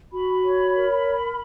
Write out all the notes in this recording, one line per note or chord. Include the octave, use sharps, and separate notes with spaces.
F#4 B5
C#5
A#4